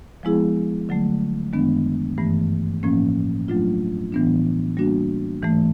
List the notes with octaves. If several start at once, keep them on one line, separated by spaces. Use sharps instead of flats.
F3 G#3 B3 E4 G#4
D3 F#3 A3
F#2 D#3 G#3 B3 D4
G2 E3 A3
A2 F3 A#3 C#4
F#3 A3 D4 F4
A2 E3 G3 B3 D4
G3 A#3 D4 F#4
G#2 E3 A3